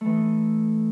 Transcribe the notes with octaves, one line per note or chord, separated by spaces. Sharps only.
E3 A3 D#4